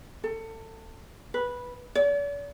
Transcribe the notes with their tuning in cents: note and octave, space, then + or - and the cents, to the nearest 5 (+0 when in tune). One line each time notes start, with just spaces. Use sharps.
A4 +25
B4 -10
D5 -45